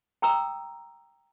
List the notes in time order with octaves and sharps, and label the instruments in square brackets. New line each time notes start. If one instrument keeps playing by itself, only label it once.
[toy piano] G5 A#5 D#6 E6